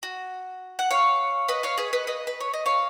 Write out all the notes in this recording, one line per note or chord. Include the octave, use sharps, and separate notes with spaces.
F#4
F#5
C#5 F5
B4 D#5
C#5 F5
G#4 B4
B4 D#5
B4 D#5
B4
C#5
D#5
C#5 F5